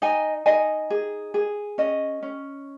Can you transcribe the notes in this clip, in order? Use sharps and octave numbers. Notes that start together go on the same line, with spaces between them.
D#4 D#5 G#5
D#4 D#5 G#5
G#4
G#4
C#4 D#5
C#4